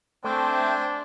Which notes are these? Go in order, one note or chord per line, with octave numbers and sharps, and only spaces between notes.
A3 C4 D4 C5 G5 G#5